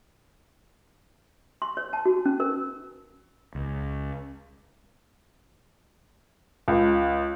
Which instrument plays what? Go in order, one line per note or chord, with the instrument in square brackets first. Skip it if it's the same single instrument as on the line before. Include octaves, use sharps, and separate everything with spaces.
[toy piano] C6
C#5
A5
F#4
C#4
A#4
[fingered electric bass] C#2
[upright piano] C#2